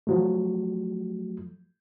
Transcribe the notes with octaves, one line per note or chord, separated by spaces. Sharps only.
F3 F#3 A3